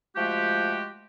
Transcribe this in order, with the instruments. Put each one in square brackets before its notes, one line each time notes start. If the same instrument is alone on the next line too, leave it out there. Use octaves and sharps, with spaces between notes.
[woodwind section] F3 G#3 A3 F#4 G4